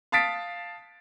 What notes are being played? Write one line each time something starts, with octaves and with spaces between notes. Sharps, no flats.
F5 A5 D#6 A6 B6 D7